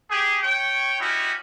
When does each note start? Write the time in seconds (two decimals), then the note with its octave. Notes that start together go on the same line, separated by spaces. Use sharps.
0.10 G4 G#4
0.43 C#5 G5
1.00 C#4 D#4 E4 F#4 G4